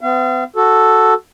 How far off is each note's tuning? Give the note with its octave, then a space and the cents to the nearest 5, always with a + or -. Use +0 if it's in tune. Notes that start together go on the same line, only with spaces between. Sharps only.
B3 +45 F5 -40
F#4 +0 A4 +0